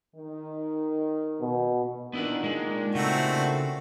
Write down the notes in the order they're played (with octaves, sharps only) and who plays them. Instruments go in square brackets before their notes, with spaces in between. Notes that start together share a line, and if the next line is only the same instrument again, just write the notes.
[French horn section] D#3
[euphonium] B2
[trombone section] A#2 D#3 D4 [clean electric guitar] B3 E4 F#5
[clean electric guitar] G#3
[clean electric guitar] C#3 [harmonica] A3 C4 F#4